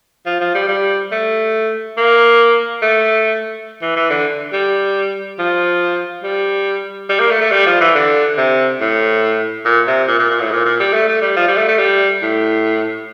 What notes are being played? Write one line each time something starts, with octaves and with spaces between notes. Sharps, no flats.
F3
F3
G3
G3
A3
A#3
A3
E3
E3
D3
G3
F3
G3
G3
A#3
A3
A3
G3
F3
E3
D3
C3
A2
A#2
C3
A#2
A#2
A#2
A2
A#2
A#2
G3
A3
A3
G3
F3
G3
A3
A3
G3
A2